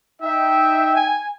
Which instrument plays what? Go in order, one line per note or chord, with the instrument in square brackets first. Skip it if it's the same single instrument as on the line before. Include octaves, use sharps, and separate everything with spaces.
[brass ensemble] D#4 G5 [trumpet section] E5
[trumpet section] G#5